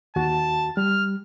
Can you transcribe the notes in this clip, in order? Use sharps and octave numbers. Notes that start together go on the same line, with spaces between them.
D#2 F#4 A5
G3 F6